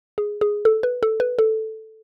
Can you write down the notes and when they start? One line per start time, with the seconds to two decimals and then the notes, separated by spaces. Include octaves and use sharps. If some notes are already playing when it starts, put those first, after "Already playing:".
0.18 G#4
0.41 G#4
0.65 A4
0.83 B4
1.03 A4
1.20 B4
1.39 A4